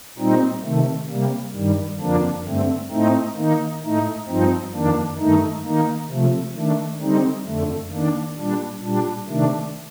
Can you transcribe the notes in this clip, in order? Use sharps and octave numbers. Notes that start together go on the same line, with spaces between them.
A#2 G3 C4 D#4
C3 D#3 A3
C3 G3 A#3
G2 D#3 G3
F2 D3 F3 A#3 D4
G2 D3 A3 C4
A2 A3 C4 D#4
D#3 A#3 D#4
A2 A3 D#4
G2 F3 C4 D#4
F2 D#3 A#3 D4
G2 D#3 A3 D#4
D#3 A#3 D#4
C3 F3 A3
D#3 A3 D4
D3 G3 C4 D#4
F2 D3 A3
D#3 A#3 D4
A#2 G3 D4
A#2 G3 D4
C3 D#3 A3 D4